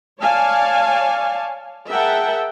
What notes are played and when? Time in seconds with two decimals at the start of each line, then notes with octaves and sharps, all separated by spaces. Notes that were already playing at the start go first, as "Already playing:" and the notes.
0.21 C#5 D5 F5 G#5 A5
1.89 G#4 A#4 E5 F#5 G5 A5